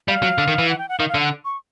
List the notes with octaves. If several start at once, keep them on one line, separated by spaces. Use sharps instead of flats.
G3 F5
F#3
D3
D#3
E3
F#5
G5
F#5
D#3 F5
F5
D3
F#5
C#6